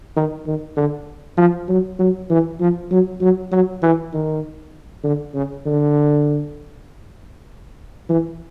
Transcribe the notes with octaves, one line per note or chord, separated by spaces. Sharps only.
D#3
D#3
D3
F3
F#3
F#3
E3
F3
F#3
F#3
F#3
E3
D#3
D3
C#3
D3
E3